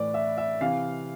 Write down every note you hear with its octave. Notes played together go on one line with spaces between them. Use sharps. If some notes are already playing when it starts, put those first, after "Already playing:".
Already playing: A2 E3 B4 D5
E5
E5
C3 E3 F5